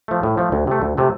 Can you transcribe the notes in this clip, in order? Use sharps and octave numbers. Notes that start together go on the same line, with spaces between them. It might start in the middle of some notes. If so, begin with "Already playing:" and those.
F3 A3
A2
F3 A3
D2
C3 A3
D2
C3 A3